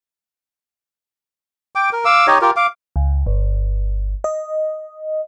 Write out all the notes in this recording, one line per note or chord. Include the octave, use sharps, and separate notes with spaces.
G5 D6
A#4
F5 D6 E6
D#4 G4 C#5 D#5
F4 G4 A#4
F5 D6
C#2
G1
D#5